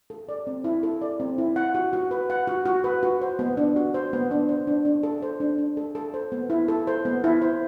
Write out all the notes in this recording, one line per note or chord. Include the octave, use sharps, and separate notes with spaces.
A4
D5
C4
E4
A4
D5
C4
E4
F#5
F#4
F#4
B4
F#5
F#4
F#4
B4
F#4
C5
B3
D4
F#4
C5
B3
D4
C5
D4
D4
A4
C5
D4
D4
A4
A4
C5
B3
E4
A4
C5
B3
E4
C5